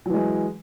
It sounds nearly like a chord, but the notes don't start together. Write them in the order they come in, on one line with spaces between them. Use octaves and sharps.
F#3 E3 G#3